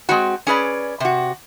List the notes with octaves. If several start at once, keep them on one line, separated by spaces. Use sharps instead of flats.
G#3 C4 F#4
C#4 G#4 B4 D5
C3 F#4